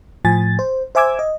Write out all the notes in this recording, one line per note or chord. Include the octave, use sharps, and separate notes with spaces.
A2 F3 G#5 A6
C5
C5 E5 G#5 D6 E6 G#6
D#5